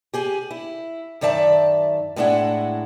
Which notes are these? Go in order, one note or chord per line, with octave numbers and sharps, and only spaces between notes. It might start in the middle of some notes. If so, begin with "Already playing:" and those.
G4 G#4 G#5
E4
F#2 D#3 D5 E5 A5
A2 G#3 D4 E4 F#5